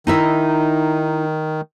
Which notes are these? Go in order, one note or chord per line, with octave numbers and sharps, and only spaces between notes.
D#3 D#4 E4 E5